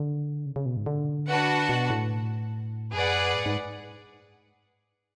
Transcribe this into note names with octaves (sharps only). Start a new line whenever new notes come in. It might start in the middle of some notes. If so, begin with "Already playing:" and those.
Already playing: D3
C#3
C#3
B2
G#2
D3
D4 F#4 B4 F#5 A5
B2
A2
F#2 G#4 B4 D5 F#5
A2
G#2